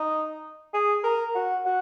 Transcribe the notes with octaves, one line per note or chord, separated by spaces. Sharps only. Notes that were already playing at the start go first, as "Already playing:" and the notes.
Already playing: D#4
G#4
A#4
F#4
F#4